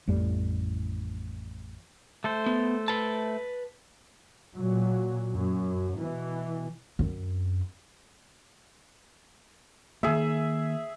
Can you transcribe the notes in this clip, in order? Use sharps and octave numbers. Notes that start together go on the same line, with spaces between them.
A1 F2 A2 G3
A3 A4 C5
B3
B4 A5
A#2 F#3
F#2
B2 E3
F#2 C4
D#3 A#3 G#4 E5